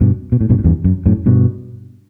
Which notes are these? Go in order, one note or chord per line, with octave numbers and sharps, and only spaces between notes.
G2 B2
B2
A2
G2 B2
A2
E2 G2
F#2
F#2 A2
G2 B2